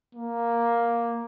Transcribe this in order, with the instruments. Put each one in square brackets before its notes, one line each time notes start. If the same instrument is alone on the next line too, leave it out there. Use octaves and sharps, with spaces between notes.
[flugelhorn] A#3